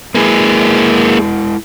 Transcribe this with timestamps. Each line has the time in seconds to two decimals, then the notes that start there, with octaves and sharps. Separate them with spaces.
0.15 G#3 A#3 E4 G#4 B4